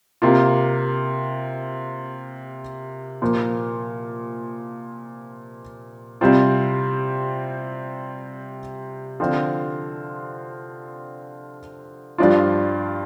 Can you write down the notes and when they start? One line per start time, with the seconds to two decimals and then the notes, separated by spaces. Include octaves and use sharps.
0.22 C3 A#3 F4
3.22 A#2 F3 A#3
6.21 C3 G3 C4 F4
9.20 D3 F3 C4 F4
12.18 G2 F3 D4 F4